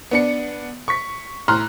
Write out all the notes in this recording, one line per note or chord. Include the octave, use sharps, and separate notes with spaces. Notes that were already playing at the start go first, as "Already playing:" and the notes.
B3 D4 C#7
C#6 B6
A2 A#5 C6 F6 F#6